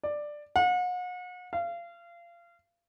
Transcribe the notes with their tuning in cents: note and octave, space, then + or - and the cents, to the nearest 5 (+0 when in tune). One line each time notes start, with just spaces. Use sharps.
D5 +10
F#5 -40
F5 -30